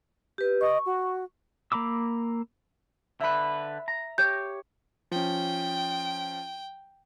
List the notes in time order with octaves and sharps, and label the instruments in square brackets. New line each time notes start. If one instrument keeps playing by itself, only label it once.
[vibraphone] G4 B4
[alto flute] D#5 [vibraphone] C#6
[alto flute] F#4
[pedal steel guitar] A#3 A#5 B5 D6 E6
[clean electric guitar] D3 B4 [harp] E5 B5
[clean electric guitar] A#5
[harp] G4 C#5 [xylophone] G6
[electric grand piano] F3 C#4 [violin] G5